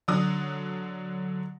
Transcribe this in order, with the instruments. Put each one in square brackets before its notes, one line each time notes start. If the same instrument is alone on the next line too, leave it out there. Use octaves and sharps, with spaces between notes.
[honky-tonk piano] D3 F#3 D4 D#6